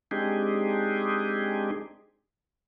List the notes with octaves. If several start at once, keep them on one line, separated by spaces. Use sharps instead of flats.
G#3 C4 D4 D#4 G4 G#4